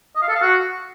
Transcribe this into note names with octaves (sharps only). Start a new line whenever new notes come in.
D#5
F5
A4
F5
F#4